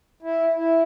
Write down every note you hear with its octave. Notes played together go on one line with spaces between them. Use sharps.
E4
E4